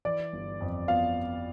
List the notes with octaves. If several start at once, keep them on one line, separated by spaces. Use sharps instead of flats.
E3 D5
G1
F2
B3 F4 F5